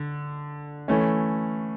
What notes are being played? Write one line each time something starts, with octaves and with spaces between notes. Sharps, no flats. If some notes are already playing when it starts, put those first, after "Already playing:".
Already playing: D3
E3 A3 C#4